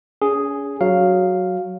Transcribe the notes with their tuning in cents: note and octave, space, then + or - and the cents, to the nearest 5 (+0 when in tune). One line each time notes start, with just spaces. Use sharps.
C#4 +40 G#4 +0
F#3 +0 F5 +0